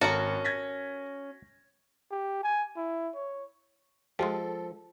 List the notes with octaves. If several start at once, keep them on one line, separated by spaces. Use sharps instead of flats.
G#1 C#4 F#4 A4 A#4 F#5
G#6 A#6 B6
G4
G#5
E4
C#5
F3 G#3 F4 G4 A4